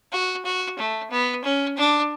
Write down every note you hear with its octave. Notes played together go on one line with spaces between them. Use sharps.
F#4
F#4
A3
B3
C#4
D4